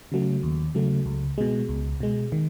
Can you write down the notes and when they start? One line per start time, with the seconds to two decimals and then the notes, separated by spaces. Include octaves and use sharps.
0.12 C#3 F#3 A3
0.43 D#2
0.75 C#3 F#3 A3
1.06 C#2
1.38 B2 G#3
1.69 C#2
2.00 B2 G#3
2.32 D#3